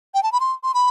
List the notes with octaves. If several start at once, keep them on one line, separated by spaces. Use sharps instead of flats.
G5
A5
B5
C6
C6
B5